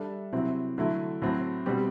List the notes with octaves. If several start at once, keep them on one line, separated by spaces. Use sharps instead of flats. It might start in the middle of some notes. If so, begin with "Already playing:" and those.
Already playing: G3 D4 A4 E5
C3 F#3 C4 E4
D3 F#3 A3 E4
A2 F#3 C4
B2 G3 C4 G4